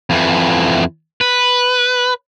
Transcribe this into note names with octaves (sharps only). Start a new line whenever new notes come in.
F2 E3
B4